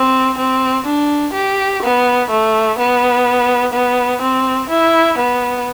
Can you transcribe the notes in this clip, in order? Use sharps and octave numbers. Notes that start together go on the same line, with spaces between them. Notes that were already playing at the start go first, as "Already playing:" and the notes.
Already playing: C4
C4
D4
G4
B3
A3
B3
B3
C4
E4
B3